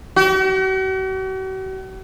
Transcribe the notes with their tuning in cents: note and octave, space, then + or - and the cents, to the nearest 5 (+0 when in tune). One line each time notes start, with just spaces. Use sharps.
F#4 +45